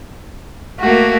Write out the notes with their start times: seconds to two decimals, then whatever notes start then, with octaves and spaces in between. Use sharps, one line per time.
0.80 A3 A#3 F#4